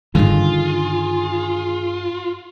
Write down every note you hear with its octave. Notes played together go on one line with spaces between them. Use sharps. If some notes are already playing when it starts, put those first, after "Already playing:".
G2 D3 D#3 D#4 F4 G#4